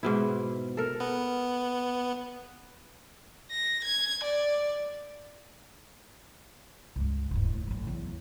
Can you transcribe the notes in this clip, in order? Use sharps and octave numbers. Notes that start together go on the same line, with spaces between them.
G#2 B2 E4
A4 A#4
B3
A#6
G#6
D5
C#2 G2
D1 G2
A2
A1 F#3
E2 F#3